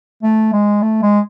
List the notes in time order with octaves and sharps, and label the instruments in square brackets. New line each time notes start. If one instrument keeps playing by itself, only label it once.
[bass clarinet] A3
G#3
A3
G#3